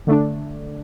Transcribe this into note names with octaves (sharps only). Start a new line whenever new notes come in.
D3 A3 D4